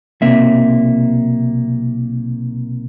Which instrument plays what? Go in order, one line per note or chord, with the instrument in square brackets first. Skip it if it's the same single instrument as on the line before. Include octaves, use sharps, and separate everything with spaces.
[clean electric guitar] B1 C3 A#3 E5